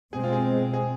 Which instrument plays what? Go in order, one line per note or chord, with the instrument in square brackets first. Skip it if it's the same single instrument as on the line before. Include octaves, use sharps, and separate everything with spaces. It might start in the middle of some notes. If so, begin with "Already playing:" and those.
[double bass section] B2 G#3 C4 [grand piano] G#4
[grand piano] F4
G#4
G#4